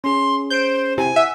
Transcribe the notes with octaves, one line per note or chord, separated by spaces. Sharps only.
C#4 G#4 C6
C5 G6 D7
C3 E4 C5 G#5
E5 F#5